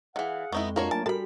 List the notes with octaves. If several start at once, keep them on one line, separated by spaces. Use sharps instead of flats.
D#3 E3 G#4 F5 F#5
F2 G#3 B3 D#4 E4 C#6
A#3 D4 F4 F#4 A#4 C#5
F#3 A3 A#3 G#5 A5
G3 F#4 A4 A#4 A5 B5